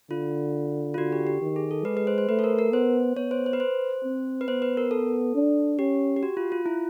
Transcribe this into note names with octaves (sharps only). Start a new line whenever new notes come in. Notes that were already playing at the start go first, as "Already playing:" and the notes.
D3 F4
F4
D3 F#4
G4
G4
D#3
G#4
A4
G#3 B4
B4
C5
C5
A3 B4
A4
A#4
A#4
B3 C5
B3 C#5
C5
C5
B4
C5
C4
B4
B3 C5
B4
A#4
A4
D4
C#4 G4
G4
F#4
F4
F4
E4